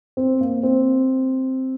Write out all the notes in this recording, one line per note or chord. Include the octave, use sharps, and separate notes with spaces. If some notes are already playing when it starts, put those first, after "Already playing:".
C4
A#3
C4